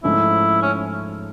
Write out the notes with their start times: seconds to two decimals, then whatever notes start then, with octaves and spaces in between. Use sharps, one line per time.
0.03 G#2 F3 A3 C#4 E4
0.62 C#4